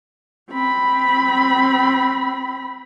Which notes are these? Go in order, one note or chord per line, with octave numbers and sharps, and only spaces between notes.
C4 B5